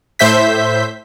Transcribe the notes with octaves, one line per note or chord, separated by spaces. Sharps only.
A2 C5 E5 G6 B6